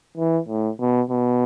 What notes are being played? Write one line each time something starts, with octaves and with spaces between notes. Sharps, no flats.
E3
A2
B2
B2